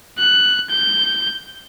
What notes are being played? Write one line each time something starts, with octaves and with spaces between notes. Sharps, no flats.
F#6
G6